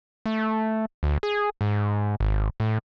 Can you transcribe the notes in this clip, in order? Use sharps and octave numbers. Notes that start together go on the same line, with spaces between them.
A3
D2
G#4
G#2
G#1
A2